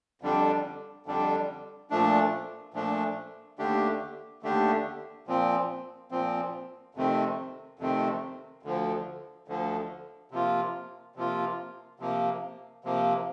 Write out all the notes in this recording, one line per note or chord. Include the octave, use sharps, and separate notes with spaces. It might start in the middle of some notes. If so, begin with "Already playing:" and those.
F2 D3 G3 D4
F2 D3 G3 D4
A#2 F3 A3 D4
A#2 F3 A3 D4
D#2 D3 A3 D4 G4
D#2 D3 A3 D4 G4
A#2 F3 C4
A#2 F3 C4
F2 C3 D#3 A3 C4
F2 C3 D#3 A3 C4
D2 D3 F3
D2 D3 F3
C3 F3 A#3 F4
C3 F3 A#3 F4
C3 F3 A#3
C3 F3 A#3